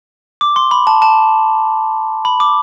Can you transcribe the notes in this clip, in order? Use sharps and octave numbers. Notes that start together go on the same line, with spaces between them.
D6
C6
B5
A5
A5
B5
D6